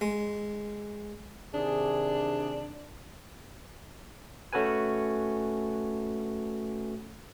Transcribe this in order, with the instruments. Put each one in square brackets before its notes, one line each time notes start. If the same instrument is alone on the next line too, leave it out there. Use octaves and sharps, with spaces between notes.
[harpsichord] G#3
[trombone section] C3 D#3 G#4 [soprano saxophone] D4
[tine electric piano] A3 C#4 F#4 A4 B4 G#5